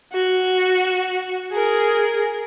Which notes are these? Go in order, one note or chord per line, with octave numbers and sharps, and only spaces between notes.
F#4
G#4 A#4